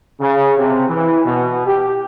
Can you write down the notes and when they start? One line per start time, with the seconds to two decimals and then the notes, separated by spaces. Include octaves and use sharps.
0.19 C#3
0.57 C3
0.88 E3
1.25 B2
1.66 G4